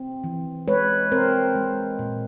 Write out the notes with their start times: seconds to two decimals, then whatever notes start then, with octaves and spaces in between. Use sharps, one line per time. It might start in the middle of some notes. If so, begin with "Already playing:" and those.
Already playing: C4
0.24 E3
0.68 G#3 B4 C#5
1.11 C4 A#4 C5
1.55 G#3
1.99 A#2